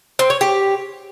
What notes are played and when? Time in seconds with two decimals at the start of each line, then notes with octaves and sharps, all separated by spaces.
0.19 C4
0.30 C#5
0.41 G4